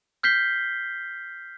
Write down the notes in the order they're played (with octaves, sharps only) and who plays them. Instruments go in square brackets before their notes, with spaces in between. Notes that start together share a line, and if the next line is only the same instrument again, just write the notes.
[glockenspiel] F6 G6 B6 C7 G7